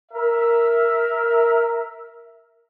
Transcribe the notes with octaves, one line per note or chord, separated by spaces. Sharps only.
A#4 E5